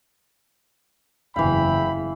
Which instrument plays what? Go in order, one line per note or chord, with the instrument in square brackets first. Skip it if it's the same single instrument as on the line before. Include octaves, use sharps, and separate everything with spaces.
[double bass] F#1 E2 [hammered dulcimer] E3 F5 [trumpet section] E5 G5 B5